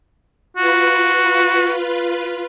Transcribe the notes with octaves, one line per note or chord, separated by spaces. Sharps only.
F4 F#4 B4